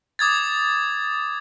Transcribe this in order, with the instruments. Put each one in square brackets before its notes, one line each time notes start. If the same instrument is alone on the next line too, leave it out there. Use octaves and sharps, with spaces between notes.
[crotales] D6 D#6 G#6 A6